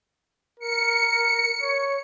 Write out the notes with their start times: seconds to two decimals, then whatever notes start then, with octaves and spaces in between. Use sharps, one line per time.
0.59 A#4 C#7
1.63 C#5